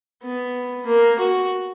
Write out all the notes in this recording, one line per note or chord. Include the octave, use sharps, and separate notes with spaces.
B3
A#3
F#4